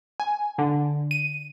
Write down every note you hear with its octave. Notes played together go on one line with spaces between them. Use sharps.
G#5
D3
D#7